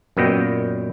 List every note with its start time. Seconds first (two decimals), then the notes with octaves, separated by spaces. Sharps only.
0.17 F#2 A#2 B3 D#5 G5